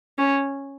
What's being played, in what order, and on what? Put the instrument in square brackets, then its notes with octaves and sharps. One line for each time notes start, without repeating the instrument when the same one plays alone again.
[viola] C#4